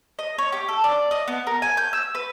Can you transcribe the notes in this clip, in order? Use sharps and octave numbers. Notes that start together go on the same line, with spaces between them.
D#5
C#5
G4
A4
D5
D#5
B3
A#4
G#5
G6
E6
B4